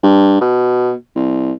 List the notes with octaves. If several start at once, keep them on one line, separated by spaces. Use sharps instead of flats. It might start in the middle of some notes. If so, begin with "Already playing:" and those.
G2
B2
C2